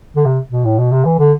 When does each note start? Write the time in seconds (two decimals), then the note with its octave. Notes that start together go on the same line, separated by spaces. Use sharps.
0.16 D3
0.25 C3
0.52 B2
0.65 A2
0.78 B2
0.92 C3
1.05 E3
1.19 D3